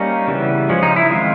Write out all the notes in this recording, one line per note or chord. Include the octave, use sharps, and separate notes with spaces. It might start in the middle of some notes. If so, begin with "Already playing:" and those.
Already playing: G3 A#3 C#4 D#4
C#3 E3 G3 B3
F3 G#3 C#4
D#4
E4
D#3 G#3 C4 F4